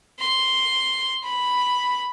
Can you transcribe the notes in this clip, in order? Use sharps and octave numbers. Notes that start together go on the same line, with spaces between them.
C6
B5